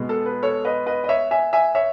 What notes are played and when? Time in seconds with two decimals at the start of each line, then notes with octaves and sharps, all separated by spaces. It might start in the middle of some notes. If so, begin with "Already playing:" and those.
Already playing: B2 G#3 B3
0.09 A4
0.26 B4
0.43 A4 C#5
0.65 B4 D#5
0.87 B4 D#5
1.04 D#5
1.09 C#5 E5
1.31 E5 G#5
1.53 E5 G#5
1.75 C#5 E5